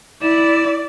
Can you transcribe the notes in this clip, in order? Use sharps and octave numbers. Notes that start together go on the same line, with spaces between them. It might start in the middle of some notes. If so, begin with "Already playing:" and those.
E4 D5 E7